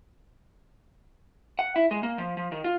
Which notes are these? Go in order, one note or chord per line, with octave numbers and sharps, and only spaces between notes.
F#5
E4
G#3
A#3
F3
F3
D#3
F4